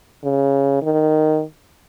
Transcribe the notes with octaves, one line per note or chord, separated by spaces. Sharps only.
C#3
D#3